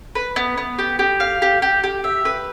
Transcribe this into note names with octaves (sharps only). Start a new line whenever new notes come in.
B4
B3
B3
G4
G4
F5
G4
G4
G4
E5
B4